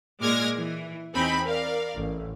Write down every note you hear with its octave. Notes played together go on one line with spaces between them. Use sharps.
A#2 G#3 D6 F6 G#6 A#6
E3
E2 C4 D#4 G#5 B5
A#4 D5 F5
A1